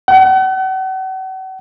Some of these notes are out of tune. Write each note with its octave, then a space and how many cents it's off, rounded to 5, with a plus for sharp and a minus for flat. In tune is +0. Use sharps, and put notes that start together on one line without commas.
F#5 +40